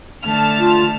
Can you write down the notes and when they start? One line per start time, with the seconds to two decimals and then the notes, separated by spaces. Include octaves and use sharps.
0.24 D3 A3 A5 F6
0.59 F4